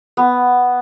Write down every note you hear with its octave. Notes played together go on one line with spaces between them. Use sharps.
B3